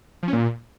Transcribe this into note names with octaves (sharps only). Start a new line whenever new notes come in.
F3
C#4
A#2